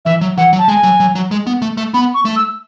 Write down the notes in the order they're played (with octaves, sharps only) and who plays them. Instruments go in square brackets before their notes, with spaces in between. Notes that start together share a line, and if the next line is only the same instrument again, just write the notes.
[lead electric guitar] E3 [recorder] E5
[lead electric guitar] F#3
[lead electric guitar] E3 [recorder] F#5
[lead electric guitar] F#3
[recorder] A5
[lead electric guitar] G#3 [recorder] G#5
[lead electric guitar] F#3
F#3
F#3
G#3
B3
A3
A3
[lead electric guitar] B3 [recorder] B5
[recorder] C#6
[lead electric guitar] A3
[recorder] E6